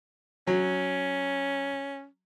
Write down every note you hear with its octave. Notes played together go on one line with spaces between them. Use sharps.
F#3 C#4